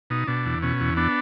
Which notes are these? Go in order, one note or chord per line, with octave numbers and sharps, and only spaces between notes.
B2 D#4
B2 D4
E2
B2 C#4
E2
B3 D4